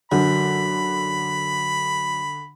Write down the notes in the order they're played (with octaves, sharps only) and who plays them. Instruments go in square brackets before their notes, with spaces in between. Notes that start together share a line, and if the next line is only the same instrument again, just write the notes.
[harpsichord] F#2 [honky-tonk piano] D3 [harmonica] B5